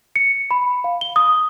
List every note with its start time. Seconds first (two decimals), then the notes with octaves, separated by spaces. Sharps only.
0.16 C#7
0.51 B5
0.84 F5
1.01 G7
1.16 D#6